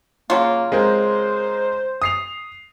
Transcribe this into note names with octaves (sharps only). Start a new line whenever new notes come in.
C#3 F#3 A#3 F4
G#3 C4 A#4 C5
D#6 C7 F7